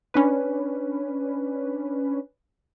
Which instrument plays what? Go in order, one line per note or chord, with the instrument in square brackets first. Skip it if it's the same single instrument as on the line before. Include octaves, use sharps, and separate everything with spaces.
[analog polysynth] C#4 D4 B4